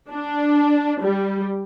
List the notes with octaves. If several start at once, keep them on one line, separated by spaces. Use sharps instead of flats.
D4
G3